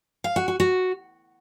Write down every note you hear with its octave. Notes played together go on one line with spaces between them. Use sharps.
F5
F#4
F#4
F#4